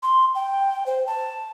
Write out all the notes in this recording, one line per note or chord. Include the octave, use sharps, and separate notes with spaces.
C6
G5
C5
A5